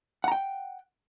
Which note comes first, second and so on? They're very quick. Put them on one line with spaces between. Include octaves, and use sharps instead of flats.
F#5 A#5 G5